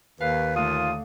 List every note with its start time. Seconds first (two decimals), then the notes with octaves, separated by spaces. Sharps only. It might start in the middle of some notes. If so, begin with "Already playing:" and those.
0.21 D#2 B4 F5
0.56 D3 A3 F4 D#6